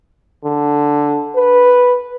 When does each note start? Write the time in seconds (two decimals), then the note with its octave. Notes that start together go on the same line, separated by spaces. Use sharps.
0.45 D3
1.36 B4